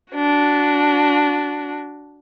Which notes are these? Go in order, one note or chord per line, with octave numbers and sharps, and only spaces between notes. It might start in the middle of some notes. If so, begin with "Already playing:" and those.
D4 F#4